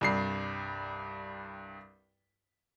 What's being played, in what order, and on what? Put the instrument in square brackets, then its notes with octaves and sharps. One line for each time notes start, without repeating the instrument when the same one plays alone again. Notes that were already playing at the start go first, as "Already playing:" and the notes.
[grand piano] C2 G2 C7